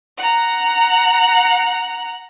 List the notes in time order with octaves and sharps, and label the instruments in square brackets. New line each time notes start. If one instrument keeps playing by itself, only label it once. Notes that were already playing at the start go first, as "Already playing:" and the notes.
[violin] F#5 A#5